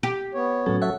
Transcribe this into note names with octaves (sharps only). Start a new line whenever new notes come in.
G4
B3 C#5
A2 F#3 C#4 A4
C#5 E5 F#5